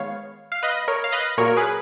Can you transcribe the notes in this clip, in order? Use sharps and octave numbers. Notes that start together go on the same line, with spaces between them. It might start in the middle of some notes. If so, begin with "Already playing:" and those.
Already playing: D#3 G#3 B3 C#5 F5
F5
B4 D#5
A#4 C#5
F5
B4 D#5
A#2 F#3 A#3 A#4 C#5
A#4
G#4 B4